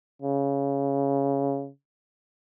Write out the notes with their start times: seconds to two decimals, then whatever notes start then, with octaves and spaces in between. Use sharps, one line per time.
0.22 C#3